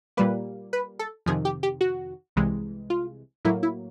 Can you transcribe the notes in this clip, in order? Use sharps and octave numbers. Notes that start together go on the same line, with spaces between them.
A#2 G3 A#3 B4
B4
A4
F2 C3 D#3 G#4
G4
G4
F#4
C2 C3 E3 G#3
F4
A2 F#3 A#3 E4
E4